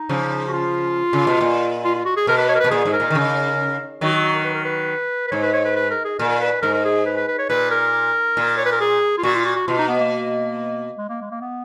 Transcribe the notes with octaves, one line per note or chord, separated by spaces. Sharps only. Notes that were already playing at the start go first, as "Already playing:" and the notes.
Already playing: D#4
C#3 F3
F#4
F4
C#3
B2
A#2
F4
F4
F#4
G#4
B2 A#4
B4
C#5
A#4
B2 B4
A#2 G#4
G#2
A#4
A#2
D#3
C#3
D#3 F#3 F#4
F#4
F#4
A#4
B4
A#4
B4
B4
G#2 C#5
B4
C#5
B4
B4
A#4
G#4
A#2 A#4
B4
G#2 A#4
A#4
G#4
B4
B4
B4
C#5
A#2 B4
A#4
A#2
C#5
B4
A#4
G#4
F4
A#2 F#4
F4
F#4
F#4
B2 F4
D#4
B3
A#3
G#3
A#3
G#3
A#3
B3